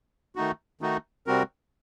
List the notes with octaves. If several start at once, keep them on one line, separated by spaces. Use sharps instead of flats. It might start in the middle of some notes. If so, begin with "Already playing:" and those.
D#3 A3 D#4 F#4
D#3 A3 D#4 F#4
C3 G3 C4 F#4 A#4